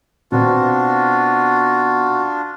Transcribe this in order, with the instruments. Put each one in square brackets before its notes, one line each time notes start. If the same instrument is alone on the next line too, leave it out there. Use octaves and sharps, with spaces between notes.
[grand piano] B2 B3 C4 [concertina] D4 F4 [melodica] F#4